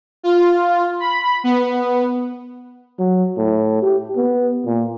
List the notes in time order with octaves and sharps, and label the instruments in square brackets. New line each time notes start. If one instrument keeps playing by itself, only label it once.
[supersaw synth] F4
B5
B3
[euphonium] F#3
A2
G4
B3
A#2